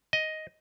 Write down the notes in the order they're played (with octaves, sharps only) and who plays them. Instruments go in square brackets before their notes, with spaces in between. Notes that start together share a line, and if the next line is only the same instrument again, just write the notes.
[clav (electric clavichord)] D#5